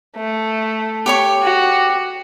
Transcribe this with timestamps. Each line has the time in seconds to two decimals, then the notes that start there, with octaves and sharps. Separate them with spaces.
0.17 A3
1.06 G4 C#5 C#6
1.43 F#4